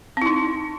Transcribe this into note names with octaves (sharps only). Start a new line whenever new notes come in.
C4 D#4 E4